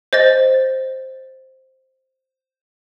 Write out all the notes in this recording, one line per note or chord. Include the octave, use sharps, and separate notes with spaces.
C5 D#5 A6